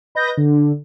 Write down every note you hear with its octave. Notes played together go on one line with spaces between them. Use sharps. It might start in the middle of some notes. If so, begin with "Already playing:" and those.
B4 D#5 G6 A#6
D3